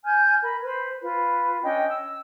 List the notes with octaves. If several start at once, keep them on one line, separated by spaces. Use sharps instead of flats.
G#5 F6 G6
A#4 B5
B4 C5 B5
F4 B4
C#4 D4 D#5 G5
E6